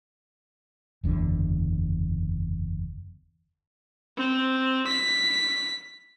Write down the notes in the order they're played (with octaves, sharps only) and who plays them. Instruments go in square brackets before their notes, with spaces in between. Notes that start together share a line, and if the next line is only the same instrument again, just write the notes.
[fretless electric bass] F#1 E2 D3
[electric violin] C4
B6